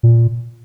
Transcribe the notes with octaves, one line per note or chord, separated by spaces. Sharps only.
A#2